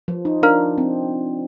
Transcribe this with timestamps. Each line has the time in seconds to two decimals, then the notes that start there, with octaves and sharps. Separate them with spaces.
0.08 F3
0.25 D#4
0.43 D4 A#4 F5 A#5 F6
0.78 C4